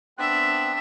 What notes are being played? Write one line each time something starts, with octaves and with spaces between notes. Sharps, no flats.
B3 C4 D4 E5 F#6